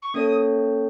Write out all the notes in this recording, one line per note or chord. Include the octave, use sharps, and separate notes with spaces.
C#6
A#3 C#4 A4 C#5 D#6